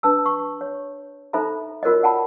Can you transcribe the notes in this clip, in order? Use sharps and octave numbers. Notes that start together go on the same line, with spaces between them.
D4 B4 A5 E6
C#6
C#5
D#4 A4 C5 E5 A#5 B5
F4 F#4 A#4 C5 C#5 D#5
D5 F#5 G5 A5 B5